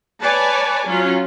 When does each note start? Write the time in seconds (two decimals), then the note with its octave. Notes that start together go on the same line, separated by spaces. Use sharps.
0.23 B4 C#5 D5 G#5 A5
0.87 F#3 C#4 F4